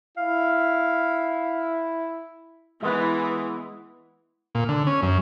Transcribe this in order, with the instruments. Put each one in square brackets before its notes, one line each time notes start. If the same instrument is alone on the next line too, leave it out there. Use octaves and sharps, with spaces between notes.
[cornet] E4 [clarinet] F5
[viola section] E3 [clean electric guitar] G#3 B3
[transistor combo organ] A#2
D3
C#4
F#2